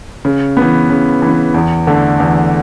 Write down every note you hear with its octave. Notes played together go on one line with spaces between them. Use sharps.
C#3
E3 B3
C#3
E3 B3
E2
D3 A3
E2